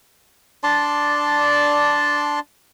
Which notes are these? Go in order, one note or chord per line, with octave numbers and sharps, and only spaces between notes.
D4 D5 A5 C6